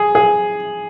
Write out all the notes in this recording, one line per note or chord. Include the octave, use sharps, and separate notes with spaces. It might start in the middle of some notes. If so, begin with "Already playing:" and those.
Already playing: G#4
G#4